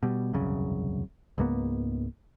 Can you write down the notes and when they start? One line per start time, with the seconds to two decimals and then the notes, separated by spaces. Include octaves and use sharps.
0.03 B2 G3
0.33 E1 C2 F#2 C#3
1.38 C#2 G#2 A#3 B3